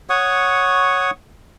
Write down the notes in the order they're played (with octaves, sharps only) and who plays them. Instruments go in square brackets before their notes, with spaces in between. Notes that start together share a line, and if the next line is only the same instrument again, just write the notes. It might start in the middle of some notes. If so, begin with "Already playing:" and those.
[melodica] C#5 F#5 C#6 D#6